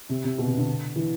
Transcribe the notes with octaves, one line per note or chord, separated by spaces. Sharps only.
C3
C3
B2
C3
D3
E3